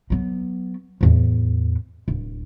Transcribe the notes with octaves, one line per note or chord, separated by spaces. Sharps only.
F#3 B3
E2 A2
D1